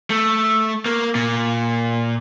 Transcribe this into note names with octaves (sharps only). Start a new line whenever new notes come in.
A3
A#3
A#2